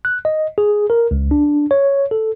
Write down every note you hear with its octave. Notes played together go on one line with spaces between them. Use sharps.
F#6
D#5
G#4
A#4
C#2
D4
C#5
A4